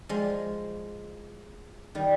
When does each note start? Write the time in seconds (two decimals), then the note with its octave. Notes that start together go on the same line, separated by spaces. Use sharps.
0.09 F3 G#3
1.95 D#3 G3